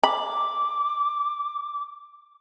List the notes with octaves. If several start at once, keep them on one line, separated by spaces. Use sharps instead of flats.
B5 D6